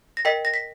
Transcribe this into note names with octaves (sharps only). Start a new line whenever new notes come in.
A#6
A#4 D#5 G5 B6
A#6
B6